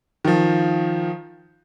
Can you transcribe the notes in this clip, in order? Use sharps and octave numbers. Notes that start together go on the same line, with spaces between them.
D#3 F3